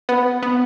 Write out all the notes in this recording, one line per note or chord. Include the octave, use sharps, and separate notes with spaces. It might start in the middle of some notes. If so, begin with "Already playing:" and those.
B3
B3